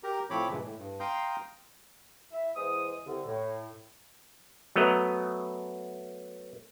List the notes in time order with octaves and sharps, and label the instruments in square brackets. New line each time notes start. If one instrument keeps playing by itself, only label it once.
[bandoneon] G4 A#4 A#5
A2 F3 C4 C#5 B5 D6
G2 A#2 C#3 E3 G#3
A2
G2
F5 G5 A#5 C6 D#6 G6
[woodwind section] E4 E5
E2 E3 G#3 C5 D#6
C2 D3
A2
[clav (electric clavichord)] F#3 A3 B3 D#5 A#5